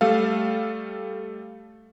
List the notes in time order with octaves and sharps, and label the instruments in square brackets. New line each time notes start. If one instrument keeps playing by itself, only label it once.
[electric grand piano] G3 A3 A4 F5